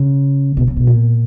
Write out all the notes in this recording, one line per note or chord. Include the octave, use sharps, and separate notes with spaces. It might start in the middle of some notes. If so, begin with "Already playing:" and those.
Already playing: C#3
B2
C#3
B2
A#2